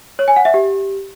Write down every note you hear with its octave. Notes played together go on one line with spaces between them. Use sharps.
C#5
G#5
F#5
E5
G4